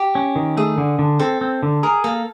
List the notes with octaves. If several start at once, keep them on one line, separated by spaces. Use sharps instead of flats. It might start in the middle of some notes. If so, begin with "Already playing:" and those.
Already playing: G4
C#4
D#3
A3 G#4
D3
D3
C4 A4
C4
D3
G#4 A#4
A#3 A4